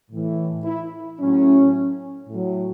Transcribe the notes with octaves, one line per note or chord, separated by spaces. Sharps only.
A2 E3
E4
A2 F#3 C#4
A2 F#3